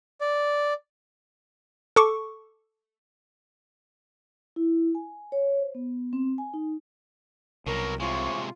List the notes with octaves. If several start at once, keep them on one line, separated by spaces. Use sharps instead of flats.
D5
A4 C#6 D6
E4
G#5
C#5
C5
B3
C4
G#5
D#4
C2 B2 F#3 A#4
C3 E3 G#3 F4 C5 C#5